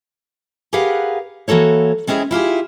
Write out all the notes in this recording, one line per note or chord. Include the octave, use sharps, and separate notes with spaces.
G4 G#4 A#4 B4 F5 F#5
E3 A#3 F#4 A4 C#5
G#3 C4 C#4 E4 G#4
E4 F4 G4 G#4